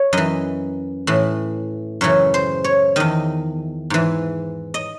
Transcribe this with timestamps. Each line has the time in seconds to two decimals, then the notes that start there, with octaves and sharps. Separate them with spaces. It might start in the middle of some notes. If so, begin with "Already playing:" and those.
Already playing: C#5
0.13 F#2 E3 D#5
1.07 A2 E3
2.01 F#2 C#3 E3 C#5
2.34 C5
2.64 C#5
2.96 E2 D#3 D#5
3.90 G#2 E3
4.74 D#5